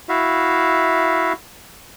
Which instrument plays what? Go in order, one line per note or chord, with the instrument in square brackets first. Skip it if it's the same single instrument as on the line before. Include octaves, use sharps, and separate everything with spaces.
[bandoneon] E4 F#4 E5 F5